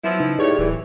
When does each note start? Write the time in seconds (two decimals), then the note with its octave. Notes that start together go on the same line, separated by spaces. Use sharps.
0.04 F3 F#3 B3 E4
0.20 C#3 D#4 B4
0.39 A2 G4 G#4 C#5 D5
0.59 D1 E3